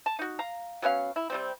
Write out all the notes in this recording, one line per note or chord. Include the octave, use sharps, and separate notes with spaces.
A5
D#4 F#4
F5 A#5
F#3 B3 C#4 F5
E4
C3 G3 C4